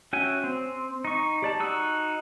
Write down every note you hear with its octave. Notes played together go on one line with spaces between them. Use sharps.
C#4 F#4 E5 G5 G#5
C4
D#4 C#6
G4 D5 A5
D#4 F#4 E6